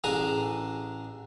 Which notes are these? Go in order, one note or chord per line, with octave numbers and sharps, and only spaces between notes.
A1 D4 G#4 A#5 D#6